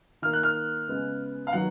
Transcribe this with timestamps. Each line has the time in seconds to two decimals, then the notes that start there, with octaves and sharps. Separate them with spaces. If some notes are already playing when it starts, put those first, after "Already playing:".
0.22 D#3 A#3 F6
0.33 F#6
0.43 F6
0.88 C#3 G#3 B3
1.47 F5
1.53 D#3 F#3 B3 F#5